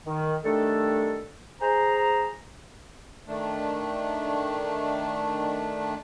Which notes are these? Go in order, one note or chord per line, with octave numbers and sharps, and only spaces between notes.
D#3
D#3 G3 A3 D4 A4
G#4 C5 A#5
D#3 A3 D4